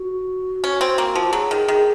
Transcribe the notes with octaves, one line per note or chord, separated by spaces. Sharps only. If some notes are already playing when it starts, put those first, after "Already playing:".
Already playing: F#4
C#4
C4
A#3
F3
F#3 G#4
D#3
D#3